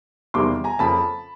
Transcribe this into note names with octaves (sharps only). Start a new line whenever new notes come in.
E2 C3 D#3 G3 A#3 C6 D6
G#5 A#5
F2 C#3 F3 A#3 A5 B5